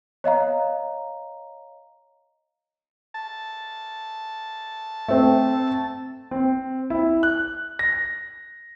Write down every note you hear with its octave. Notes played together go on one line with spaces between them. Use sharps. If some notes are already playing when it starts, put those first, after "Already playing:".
C#5 D#5 F5 A#5
A5
A3 C4
C4
E4
F#6
A#6